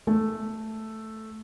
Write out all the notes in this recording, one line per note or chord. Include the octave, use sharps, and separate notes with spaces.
A3